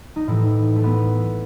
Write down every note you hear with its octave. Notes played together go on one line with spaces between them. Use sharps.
D#4
A2 E3 E4
A3
B3